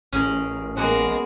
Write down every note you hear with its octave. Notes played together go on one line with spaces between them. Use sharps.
A1 C#4 G#4 A#4
G#3 A#3 B3 F#4 A#4